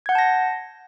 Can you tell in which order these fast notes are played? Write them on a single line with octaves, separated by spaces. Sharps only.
G#6 F#5 G6 A5 A#6